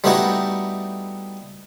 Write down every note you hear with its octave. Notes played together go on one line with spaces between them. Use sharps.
G3 A3 B3 D#4 E4 F#4